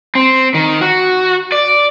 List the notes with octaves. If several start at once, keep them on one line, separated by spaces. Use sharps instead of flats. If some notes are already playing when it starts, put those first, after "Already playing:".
C4
D#3
F#4
D5